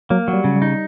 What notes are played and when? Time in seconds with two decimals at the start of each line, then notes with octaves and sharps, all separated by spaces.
0.10 F#3 A#3
0.28 F#3
0.33 G3
0.44 C#3
0.56 G3
0.62 D#4